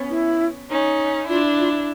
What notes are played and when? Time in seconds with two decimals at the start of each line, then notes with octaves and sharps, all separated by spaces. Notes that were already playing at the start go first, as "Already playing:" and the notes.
Already playing: B3 C#4
0.10 E4
0.69 C#4 D#4
1.28 D4 E4 F4
1.59 F4